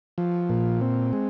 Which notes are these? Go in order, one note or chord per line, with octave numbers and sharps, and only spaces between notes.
F3
A#2
C4
G#3